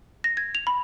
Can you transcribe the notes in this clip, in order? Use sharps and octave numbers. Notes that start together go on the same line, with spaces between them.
A#6
G#6
F7
B5